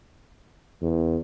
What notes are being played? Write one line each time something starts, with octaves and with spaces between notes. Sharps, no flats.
E2